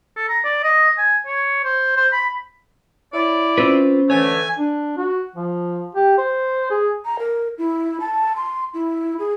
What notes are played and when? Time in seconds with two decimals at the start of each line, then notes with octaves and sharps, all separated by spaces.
0.17 A4
0.29 A#5
0.45 D5
0.64 D#5
0.98 G#5
1.27 C#5
1.64 C5
1.96 C5
2.13 B5
3.13 E4 C#5 D5
3.58 C4 C#4 F4 B4 C5
4.10 D3 E3 A3 C#5 G#5
4.59 D4
4.98 F#4
5.36 F3
5.95 G4
6.18 C5
6.70 G#4
7.05 A#5
7.19 A#4
7.58 E4
8.00 A5
8.36 C6
8.74 E4
9.19 G#4